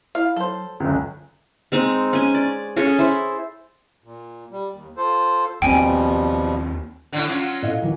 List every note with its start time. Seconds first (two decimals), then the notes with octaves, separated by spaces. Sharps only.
0.15 E4 F5
0.36 F#3 A4 C5
0.80 F#1 C#2 D3
1.72 G#3 C4 D#4
2.13 C#4 G#5
2.34 D5
2.76 C#4 G#4 A4 C#5
2.98 E4 C5
4.04 A#2
4.51 G3
4.71 D#2
4.97 F4 A4 C5
5.62 D#2 B2 F3 G3 B3 C4 G5 G#5
7.13 A2 D3
7.27 F#3 C#4 F4
7.62 A2 D#5 F5
7.82 D#3 E3 F#3